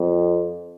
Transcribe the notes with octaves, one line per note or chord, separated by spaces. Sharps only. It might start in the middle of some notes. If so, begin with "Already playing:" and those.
Already playing: F2